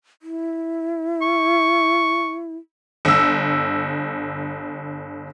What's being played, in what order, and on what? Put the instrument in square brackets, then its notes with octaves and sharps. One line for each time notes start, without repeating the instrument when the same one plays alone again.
[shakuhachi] E4
[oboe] C#6
[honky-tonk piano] G1 E6